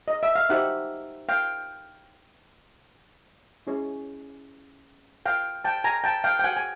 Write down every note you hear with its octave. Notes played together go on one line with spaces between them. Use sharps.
D#5
E5
F5
D#4 G4 C5 E5 F#5
F5 G5
C#4 E4 G#4 C#5
F5 G5
G5 A5
G#5 A#5
G5 A5
F5 G5
G5
F#5 G#5
G#5